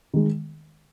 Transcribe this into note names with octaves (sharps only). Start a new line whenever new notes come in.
D#3 G#3